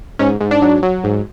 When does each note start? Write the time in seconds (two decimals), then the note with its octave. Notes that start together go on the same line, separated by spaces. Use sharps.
0.19 G#2 C#4
0.40 G#2
0.51 D4
0.62 F#3
0.83 F#3
1.04 G#2